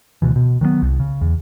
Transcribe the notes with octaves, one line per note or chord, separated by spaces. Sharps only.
D2 B2 E3
B2
D#3 F#3 G3 B3
C2
C#3
E2